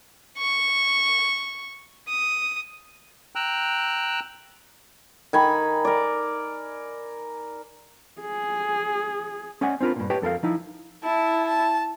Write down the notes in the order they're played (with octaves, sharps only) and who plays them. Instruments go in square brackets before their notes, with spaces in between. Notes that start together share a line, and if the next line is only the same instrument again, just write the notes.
[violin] C#6
D#6
[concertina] G5 A#5 E6 F#6
[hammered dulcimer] D#3 G#5 B5
A#4 D5
[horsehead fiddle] G#4
[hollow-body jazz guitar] C#4 D5 D#5 F#5 G#5
C4 D4 F4 A#4 B4
G2 A#2
G4 B4 C#5 D#5 G5 A5
F2 A4 A#4 F5
F3 D#4 E4
[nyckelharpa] E4 [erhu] A5
[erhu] A5